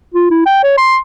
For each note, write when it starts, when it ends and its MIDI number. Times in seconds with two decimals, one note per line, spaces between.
0.14 0.27 65
0.31 0.44 64
0.46 0.59 79
0.64 0.77 73
0.78 0.98 84